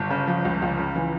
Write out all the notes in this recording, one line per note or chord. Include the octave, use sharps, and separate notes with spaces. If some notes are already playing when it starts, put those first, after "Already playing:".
Already playing: G1 A5
C#3
F3
C#2
C#2
C#3
E3